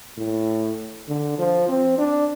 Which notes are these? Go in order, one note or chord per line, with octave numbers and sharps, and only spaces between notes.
A2
D3
F3
C4
D4